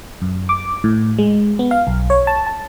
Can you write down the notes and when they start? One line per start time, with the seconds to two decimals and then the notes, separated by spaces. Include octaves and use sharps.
0.22 F#2
0.49 D6
0.84 A2
1.18 G#3
1.59 B3
1.71 F5
1.87 B1
2.10 C#5
2.27 A5
2.47 A5